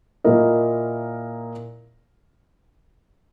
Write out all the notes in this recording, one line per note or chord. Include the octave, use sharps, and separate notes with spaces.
A#2 A#3 E4 A#4 D#5